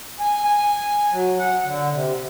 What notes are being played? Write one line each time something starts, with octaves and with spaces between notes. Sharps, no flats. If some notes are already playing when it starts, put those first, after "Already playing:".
G#5
G#5
F#3
F#5
D3
C3